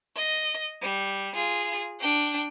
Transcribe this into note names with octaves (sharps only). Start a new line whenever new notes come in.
D#5
G3
F4 G#4
D4 G5